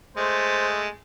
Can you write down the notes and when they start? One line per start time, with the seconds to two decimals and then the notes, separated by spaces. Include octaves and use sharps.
0.17 G#3 A3 C5